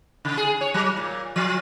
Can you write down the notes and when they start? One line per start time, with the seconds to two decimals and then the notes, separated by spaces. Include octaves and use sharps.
0.25 C#3
0.37 G#4
0.61 C#5
0.74 F#3
0.97 A#2
1.36 F3